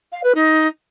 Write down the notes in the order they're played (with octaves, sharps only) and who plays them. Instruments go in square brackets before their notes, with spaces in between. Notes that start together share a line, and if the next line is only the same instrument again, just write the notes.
[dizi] F5
B4
D#4